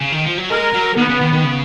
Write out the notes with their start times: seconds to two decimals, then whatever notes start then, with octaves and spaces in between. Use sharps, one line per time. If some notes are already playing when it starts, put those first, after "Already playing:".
0.00 C#3
0.12 D#3
0.25 F3
0.38 F#3
0.50 G#3 A#4
0.74 F#3
0.97 D#3 B3
1.09 C#3
1.21 D#3
1.33 D#3
1.44 C#3